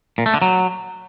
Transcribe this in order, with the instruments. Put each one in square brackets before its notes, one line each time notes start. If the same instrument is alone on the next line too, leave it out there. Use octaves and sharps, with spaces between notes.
[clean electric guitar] A#2
A3
D3
F#3